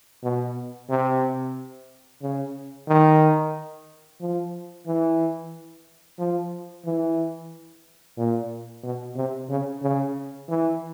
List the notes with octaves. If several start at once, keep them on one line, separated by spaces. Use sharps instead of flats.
B2
C3
C#3
D#3
F3
E3
F3
E3
A#2
B2
C3
C#3
C#3
E3